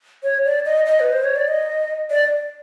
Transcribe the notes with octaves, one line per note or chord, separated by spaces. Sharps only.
C#5
D5
D#5
D#5
B4
C5
C#5
D5
D#5
D5